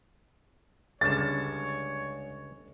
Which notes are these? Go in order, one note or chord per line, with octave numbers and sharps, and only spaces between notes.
C#2 D3 G3 G#3 D4 C#5 A6 E7